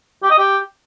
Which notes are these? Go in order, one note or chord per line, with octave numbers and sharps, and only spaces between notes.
G4
D#5
G4